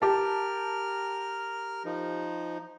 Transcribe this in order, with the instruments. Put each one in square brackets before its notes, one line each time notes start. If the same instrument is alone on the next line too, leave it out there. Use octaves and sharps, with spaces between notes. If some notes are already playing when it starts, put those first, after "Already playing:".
[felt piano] G4 A5 [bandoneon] A#4 F6
[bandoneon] F3 D#4